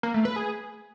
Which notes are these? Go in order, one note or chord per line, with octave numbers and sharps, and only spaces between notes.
A#3
A3
B4
G#4